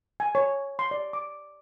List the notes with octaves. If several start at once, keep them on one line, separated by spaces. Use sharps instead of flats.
G#5
C#5
C6
D5
D6